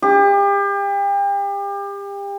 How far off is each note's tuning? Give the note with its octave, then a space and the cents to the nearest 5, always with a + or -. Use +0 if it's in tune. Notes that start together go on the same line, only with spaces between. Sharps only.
G4 +35